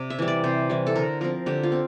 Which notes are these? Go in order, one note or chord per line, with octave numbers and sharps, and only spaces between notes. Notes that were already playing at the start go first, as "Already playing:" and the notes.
Already playing: C3 D5
E5
E3 G3
D5
C3 C5
E3 G3
A4
D3 A#4
F3 C4 A#4
D3 G4
F4
C4